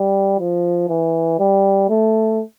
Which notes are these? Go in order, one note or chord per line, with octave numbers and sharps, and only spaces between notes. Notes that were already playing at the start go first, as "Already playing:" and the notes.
Already playing: G3
F3
E3
G3
A3